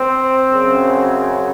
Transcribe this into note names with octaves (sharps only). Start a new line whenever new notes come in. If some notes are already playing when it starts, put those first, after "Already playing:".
Already playing: C4
F#2 C#3 F#3